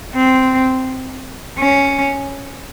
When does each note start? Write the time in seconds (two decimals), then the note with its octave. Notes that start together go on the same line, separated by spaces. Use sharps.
0.15 C4
1.59 C#4